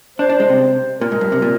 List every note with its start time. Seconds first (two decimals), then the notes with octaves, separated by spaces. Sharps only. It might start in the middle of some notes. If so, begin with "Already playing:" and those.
0.18 D4 C5
0.29 D4
0.40 G#3
0.49 C3
1.00 A#2 A#4
1.12 G#2
1.21 G2
1.32 C3
1.42 A#2